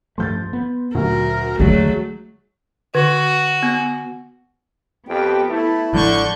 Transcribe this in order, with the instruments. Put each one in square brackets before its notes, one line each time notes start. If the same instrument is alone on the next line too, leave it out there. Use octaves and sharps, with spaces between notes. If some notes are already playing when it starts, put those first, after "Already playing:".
[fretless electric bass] G2 F3 A3 [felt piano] C6 G6 A6
[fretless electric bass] B3
[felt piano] D2 F#3 [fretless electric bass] A#2 [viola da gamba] A#4
[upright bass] D#2 D4 [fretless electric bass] D3 [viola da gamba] F#3 A3 [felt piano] G#3
[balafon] D3 [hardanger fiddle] F#4
[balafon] B3
[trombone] F2 [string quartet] B3 [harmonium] G4 G5
[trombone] A3 [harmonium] E4
[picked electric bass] A1 F3 G#3 [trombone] D3 [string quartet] C#6 G6